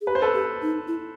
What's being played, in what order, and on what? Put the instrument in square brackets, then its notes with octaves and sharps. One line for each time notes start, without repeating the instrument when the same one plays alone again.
[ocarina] G#4
[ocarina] G4 [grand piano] B4
[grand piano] C5
A4 B4
[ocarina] G4
D#4
E4